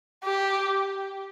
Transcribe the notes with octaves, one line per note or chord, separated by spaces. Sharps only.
G4